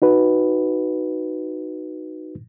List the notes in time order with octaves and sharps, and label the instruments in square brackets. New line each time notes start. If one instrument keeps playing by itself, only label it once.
[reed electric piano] D#4 F#4 B4